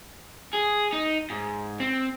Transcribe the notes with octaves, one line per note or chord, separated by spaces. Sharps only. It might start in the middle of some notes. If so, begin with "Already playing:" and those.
G#4
D#4
G#2
C4